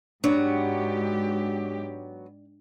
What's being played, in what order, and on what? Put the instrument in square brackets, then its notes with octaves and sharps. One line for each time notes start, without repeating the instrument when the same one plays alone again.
[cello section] G#2 G4 [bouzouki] F#3 B3 [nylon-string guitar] D4